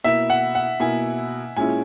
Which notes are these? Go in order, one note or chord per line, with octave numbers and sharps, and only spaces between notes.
B2 A#3 E4 E5
F#5
F#5
B2 A#3 E4 G#5
A#2 G#3 C#4 E4 G#5